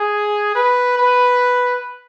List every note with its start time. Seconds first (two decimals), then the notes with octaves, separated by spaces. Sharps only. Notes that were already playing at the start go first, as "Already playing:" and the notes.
Already playing: G#4
0.55 B4
0.98 B4